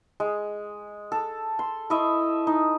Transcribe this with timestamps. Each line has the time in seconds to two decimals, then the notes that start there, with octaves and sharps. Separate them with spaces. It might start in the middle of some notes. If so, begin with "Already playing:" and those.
0.20 G#3
1.12 A4
1.59 C6
1.90 E4 C#5 D#5 E5
2.47 D#4